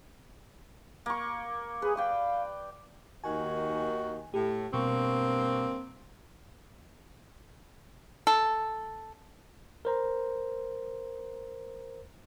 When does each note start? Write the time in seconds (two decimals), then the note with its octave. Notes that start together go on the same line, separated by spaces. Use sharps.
1.06 A#3 C#6
1.82 G#4 B4
1.97 D5 F5 G5
3.24 D#2 D#3 F#4 G#5
4.34 A2 G4
4.73 G2 B2 A#3 C4 C#6
8.27 A4
9.85 A#4 C5 A#5